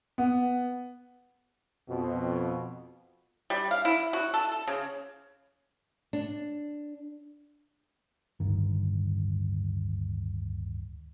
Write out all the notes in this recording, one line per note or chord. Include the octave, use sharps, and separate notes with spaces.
B3
F2 B2
G3
F5
E4
F#4
A4
A4
C#3
D4
D1 D2 G2 D#3